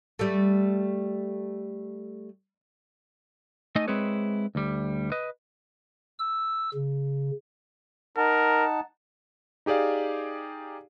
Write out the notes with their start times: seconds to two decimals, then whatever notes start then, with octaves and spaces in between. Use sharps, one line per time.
0.19 G3 A3
3.76 A3 D#4 A4 D#5 G#5
3.88 G#3 C4 E4 G#4 B4 C#5
4.55 D2 G3
5.12 B4 D#5
6.19 E6
6.74 C#3
8.17 D#4 A#4 F#5 A5
9.66 D#4 G4 G#4 D5 F5